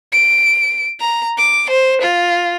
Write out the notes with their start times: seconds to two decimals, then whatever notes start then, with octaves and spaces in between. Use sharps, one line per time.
0.12 D7
1.00 A#5
1.38 D6
1.70 C5
2.01 F4